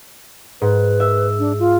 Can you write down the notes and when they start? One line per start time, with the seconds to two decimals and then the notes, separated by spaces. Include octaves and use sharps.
0.62 G#2 B4
1.00 E5
1.39 D4
1.59 F4